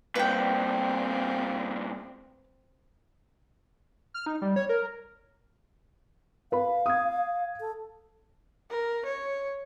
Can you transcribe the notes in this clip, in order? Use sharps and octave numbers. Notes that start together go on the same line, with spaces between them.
G2 A#2 C4 B4 F#5 G5
F6
D#4
G3
C#5
A#4
B4 F5 B5
D#6 G#6
A4
A#4
C#5